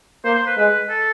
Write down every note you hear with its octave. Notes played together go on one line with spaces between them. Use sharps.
A#3 C5
C5
B4
G#3 B4
A4